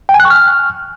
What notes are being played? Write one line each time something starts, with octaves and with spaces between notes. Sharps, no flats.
G5
G#5
F#6
C#6
F6